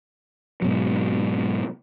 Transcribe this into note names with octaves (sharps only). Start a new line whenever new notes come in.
G#2 B2 F#3